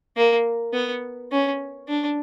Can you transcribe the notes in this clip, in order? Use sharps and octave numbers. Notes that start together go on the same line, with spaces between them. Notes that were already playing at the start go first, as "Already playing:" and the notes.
A#3
B3
C#4
D4